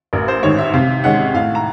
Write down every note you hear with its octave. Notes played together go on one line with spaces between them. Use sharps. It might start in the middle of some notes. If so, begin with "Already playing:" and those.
A1 A#4
C5
G#2 D#3 C#5
E5
C3 F5
D#3 G#3 C#4 F#5
A2 F5
A#5